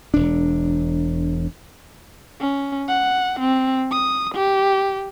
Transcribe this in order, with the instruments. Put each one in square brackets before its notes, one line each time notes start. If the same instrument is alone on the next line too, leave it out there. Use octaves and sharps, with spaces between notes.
[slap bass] E1 D4
[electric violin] C#4
F#5
C4
D#6
G4